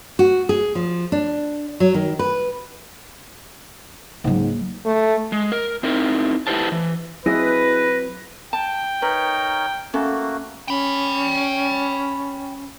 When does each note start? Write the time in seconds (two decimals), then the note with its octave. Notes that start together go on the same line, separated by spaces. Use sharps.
0.19 F#4
0.49 G#4
0.75 F3
1.12 D4
1.80 F#3
1.94 D#3
2.19 B4
4.24 C#2 G#2 F#3 A#3
4.86 A3
5.32 G#3
5.52 A#4
5.83 C4 D#4 E4 A#4
6.47 A3 E4 G4 B4 C5 A5
6.72 E3
7.26 F#3 C4 E4 G#4 B4 D#5 A#6
8.53 G5 A5
9.02 D#4 A#4 B4 C#5
9.94 A3 A#3 C#4 F#4 A4
10.68 C#4 G5 B5